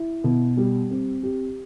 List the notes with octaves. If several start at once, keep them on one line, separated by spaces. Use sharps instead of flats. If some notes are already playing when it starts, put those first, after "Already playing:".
Already playing: E4
B2
G3
C4
G4